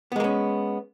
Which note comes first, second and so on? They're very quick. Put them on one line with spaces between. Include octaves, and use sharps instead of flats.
B3 G#3 A#3 C#4